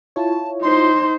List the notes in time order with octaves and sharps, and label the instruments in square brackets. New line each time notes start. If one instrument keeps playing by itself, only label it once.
[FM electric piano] E4 F4 C#5 [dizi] A5
[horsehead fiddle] D#4 C5 [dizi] C6